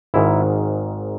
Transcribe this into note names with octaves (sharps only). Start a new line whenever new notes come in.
G#1 G#2 D#3 E4